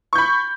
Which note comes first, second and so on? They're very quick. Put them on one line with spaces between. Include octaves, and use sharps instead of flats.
C#6 G6 B5